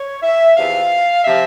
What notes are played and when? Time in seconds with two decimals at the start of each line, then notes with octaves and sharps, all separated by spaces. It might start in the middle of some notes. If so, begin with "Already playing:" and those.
Already playing: C#5
0.23 E5
0.56 E2 C3 F3 F5
1.24 C3 F3 E5